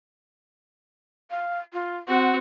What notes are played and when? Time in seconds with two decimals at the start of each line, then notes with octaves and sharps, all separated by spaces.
1.30 F5
1.73 F4
2.08 C4 F#4 F#5